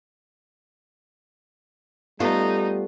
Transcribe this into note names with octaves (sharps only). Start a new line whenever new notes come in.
G3 A3 B3 D#4 F4